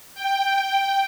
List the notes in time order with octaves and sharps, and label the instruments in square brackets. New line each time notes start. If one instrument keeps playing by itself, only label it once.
[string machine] G5